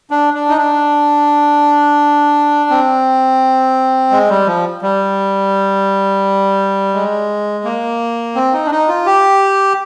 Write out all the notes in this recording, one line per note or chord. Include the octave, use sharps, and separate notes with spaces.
D4
D4
D#4
D4
C4
G#3
G3
F3
G3
G#3
A#3
C4
D#4
D4
D#4
F4
G4